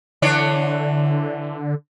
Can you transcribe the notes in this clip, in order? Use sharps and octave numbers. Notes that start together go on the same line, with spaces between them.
D3 E3 D4 C#5